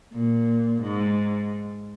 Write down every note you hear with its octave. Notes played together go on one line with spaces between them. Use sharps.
A#2
G#2